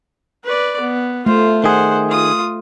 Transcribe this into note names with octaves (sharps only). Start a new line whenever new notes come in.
B4 D5
B3
A3 F4 C5
D#3 G#4 C5 F#5
F4 D#6